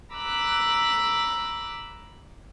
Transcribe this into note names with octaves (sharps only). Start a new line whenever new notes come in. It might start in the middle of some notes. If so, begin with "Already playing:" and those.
A#5 B5 D6 E6 F#6